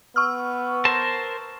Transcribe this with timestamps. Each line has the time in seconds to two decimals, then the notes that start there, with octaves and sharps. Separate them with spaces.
0.16 B3 C#6 E6 F6
0.85 A#4 C5 A5